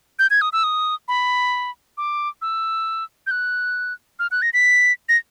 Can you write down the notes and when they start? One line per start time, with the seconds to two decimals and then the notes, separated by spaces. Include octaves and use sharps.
0.19 G6
0.30 G#6
0.41 D#6
0.53 E6
0.64 D#6
1.08 B5
1.97 D6
2.42 E6
3.27 G6
3.31 F#6
4.19 F6
4.31 F#6
4.42 A#6
4.54 B6
5.09 A#6